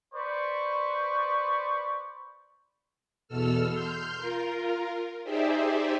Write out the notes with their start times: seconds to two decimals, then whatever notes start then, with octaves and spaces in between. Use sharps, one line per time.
0.13 B4 C5 D5 C#6
3.28 E2 B2 A4 E6 F6
3.71 C6 F6 G6
4.18 F4 A#4
5.23 D#4 G4 G#4 C5 D5 E5